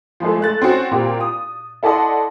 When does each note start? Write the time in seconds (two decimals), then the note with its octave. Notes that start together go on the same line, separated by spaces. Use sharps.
0.20 F3 G#3 A3
0.41 A3 F#6 A6
0.62 C4 C#4 F#4
0.91 A#2 C4 G4
1.21 D#6
1.83 E4 A4 D5 D#5 F#5 C6